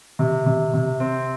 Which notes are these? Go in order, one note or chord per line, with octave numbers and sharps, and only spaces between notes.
C3
C3
C3
C4